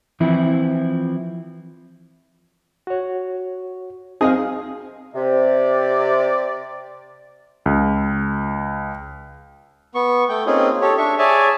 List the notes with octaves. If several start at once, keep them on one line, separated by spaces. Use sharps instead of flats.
E3 F3 C4 E4
F#4 C#5
C4 D#4 G#4 D#5 F5 D#6
C3 D5
C#2
B3 C#6
A3 G5
A#3 C4 C#4 D#4 F4 G#4
G4 A4 C#5
D4 E5 C#6
G#4 C#5 D5 E5 G#5 A5